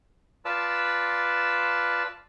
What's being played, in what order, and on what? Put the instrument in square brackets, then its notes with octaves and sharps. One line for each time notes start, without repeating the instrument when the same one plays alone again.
[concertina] F4 B4 D5 A5 E6